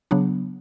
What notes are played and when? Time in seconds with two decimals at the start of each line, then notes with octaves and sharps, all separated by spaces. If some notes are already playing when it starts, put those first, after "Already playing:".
0.11 C#3 F#3 B3 D4